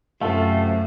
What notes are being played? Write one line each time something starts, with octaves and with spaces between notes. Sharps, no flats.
F#2 C3 A3 F4 A4